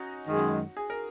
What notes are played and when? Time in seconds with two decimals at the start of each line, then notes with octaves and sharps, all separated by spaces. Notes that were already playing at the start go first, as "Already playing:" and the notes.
Already playing: C#4 D#4 F#4
0.26 F#2 D#3 G#3
0.77 G#4
0.90 A#4